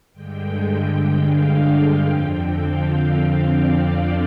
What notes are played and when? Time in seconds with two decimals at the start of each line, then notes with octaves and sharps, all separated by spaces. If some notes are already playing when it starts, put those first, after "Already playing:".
0.12 G2 D3 G#3 G5
1.10 F5
1.57 G5
2.05 F2 D3 F3 C4
2.54 F5
3.49 D5